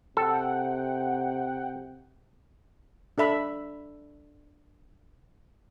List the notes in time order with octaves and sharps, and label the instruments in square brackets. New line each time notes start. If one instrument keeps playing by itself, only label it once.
[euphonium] C3 [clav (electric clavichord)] A4 [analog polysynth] F#5 G5
[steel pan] D4 A4 E5 B5